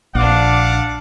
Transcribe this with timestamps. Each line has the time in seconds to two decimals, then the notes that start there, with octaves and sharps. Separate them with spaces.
0.15 A#1 D4 D5 F5 F#5 D6